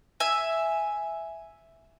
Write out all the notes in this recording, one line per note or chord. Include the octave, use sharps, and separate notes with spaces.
E5 G#5